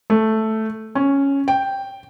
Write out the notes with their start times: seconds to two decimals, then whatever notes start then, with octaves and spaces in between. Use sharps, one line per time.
0.10 A3
0.95 C#4
1.48 G5